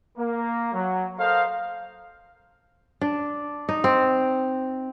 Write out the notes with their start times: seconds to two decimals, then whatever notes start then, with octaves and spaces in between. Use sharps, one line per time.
0.18 A#3
0.73 F#3
1.18 A4 A#4 C5 D#5 F5
3.01 D4
3.69 D#4
3.84 C4